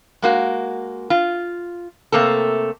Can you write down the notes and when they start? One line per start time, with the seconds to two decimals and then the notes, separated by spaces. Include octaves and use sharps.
0.22 G#3 A#3 F#4
1.10 F4
2.12 C3 A3 A#3 C4 A4